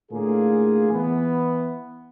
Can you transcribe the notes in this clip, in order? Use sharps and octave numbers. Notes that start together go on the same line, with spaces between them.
A2 D3 A#3 F4 G#4
E3 B3